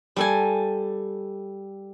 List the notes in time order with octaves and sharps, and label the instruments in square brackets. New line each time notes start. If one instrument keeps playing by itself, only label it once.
[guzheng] G3 A4 G#5